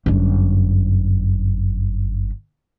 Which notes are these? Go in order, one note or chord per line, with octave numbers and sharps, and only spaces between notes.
G1 F#2